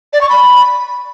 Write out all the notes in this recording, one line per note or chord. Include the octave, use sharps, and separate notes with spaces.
D5
C#6
B5